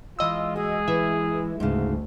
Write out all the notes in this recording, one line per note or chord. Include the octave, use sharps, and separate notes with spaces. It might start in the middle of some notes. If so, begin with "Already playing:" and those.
E3 G#3 F4 D#5 E6
F#4 G#4
E3 E5
D2 G#2 C#3